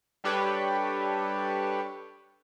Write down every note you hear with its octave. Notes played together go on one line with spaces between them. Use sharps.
G3 D4 G4 A4 B4 C#5